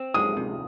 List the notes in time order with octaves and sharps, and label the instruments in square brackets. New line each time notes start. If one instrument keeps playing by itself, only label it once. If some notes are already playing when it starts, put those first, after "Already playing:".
Already playing: [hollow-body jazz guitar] C4
[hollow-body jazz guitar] G#3 [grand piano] D#6
[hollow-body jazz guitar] C3